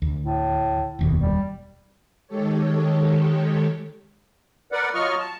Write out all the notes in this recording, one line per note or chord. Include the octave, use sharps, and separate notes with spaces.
D2
A2
F1 D#2 B2
G3
D#3 G#3 G4 A4 C#5
A#4 B4 D5 F#5
F#3 F4 D#5 C#6 F6
A5